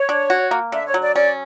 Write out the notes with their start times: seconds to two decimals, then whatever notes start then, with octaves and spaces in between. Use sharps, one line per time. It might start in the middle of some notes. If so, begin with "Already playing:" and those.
Already playing: C#5
0.09 D4
0.30 F#4
0.51 A#3
0.72 D3 E5
0.87 C#5
0.94 F#3
1.02 D5
1.15 C#4 D5